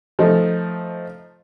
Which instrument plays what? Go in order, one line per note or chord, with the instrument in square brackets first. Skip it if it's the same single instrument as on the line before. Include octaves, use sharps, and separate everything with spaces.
[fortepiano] F3 A3 D#4